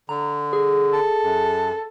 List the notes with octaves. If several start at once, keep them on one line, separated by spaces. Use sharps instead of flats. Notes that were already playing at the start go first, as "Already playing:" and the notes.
D3 A#5
G#4
A4
F#2